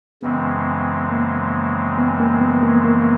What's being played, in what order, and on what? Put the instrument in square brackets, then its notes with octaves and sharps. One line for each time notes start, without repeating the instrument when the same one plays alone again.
[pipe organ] F#2 C#3 E3 G#3 C4 [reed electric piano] B3
[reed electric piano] A#3
B3
A#3
B3
A#3
A#3